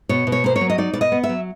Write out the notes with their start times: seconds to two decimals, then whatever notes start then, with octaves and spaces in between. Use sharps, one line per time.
0.09 B2 C#5
0.27 B2
0.32 C#5
0.44 A#3 C5
0.56 C#5
0.61 F#3
0.70 D#5
0.78 D#4 D5
0.94 B2 D5
1.01 D#5
1.12 B3
1.24 E5
1.29 F#3